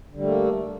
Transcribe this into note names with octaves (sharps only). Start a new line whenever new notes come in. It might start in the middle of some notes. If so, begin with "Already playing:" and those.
D3 G3 A3 A#3